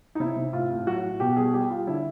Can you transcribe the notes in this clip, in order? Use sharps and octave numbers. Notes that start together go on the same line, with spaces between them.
D#4
C3 E4
C3
A2 F4
A2
F#3 F#4
A2
B2 G4
G3 G#4
G3 G4
G3 F4
D3 E4